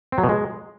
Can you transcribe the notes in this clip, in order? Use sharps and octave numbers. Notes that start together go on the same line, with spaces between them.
C4
F#3
B2
G#3